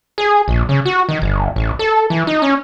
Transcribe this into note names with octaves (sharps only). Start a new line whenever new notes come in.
G#4
A#1
C#3
F#4
D#3
G1
A1
A4
E3
D#4
C#4